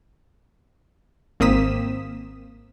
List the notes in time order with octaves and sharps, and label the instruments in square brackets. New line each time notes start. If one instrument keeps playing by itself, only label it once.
[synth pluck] G#1 A#3 C4 D#6 B6 E7